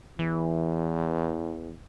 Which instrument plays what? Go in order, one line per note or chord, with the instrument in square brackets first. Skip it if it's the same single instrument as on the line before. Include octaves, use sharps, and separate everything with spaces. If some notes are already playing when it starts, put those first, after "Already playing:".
[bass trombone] E2 [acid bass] E3